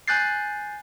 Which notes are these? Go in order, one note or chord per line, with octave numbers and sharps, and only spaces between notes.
G#5 F#6 G6 A6 C7